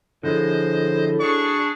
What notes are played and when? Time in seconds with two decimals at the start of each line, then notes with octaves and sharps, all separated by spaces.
0.23 A2 D3 F3 G#4 C5 D#5
1.20 D4 F#4 G#4 D5 C#6